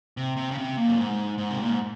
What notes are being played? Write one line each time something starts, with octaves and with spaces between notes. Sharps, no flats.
C3
C3
C#3
C3
A#2
F#2
G#2
G#2
C3
A#2
G#2